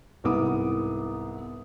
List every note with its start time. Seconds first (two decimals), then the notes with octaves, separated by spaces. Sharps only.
0.24 C2 G#2 B3 D6 D#6